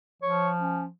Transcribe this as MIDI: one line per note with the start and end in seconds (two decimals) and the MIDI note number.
0.22 0.88 53
0.22 0.49 73
0.61 0.85 61